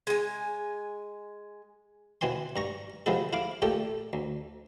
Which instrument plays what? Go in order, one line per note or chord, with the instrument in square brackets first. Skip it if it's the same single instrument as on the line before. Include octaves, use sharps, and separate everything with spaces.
[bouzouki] G#3 G#5
[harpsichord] B2 E3 C4 G#5 C6
G2 A#5 C#6
C3 F3 G#3 B3 E4 A4
E4 F5 D6
A#2 A3 G4 A4
D2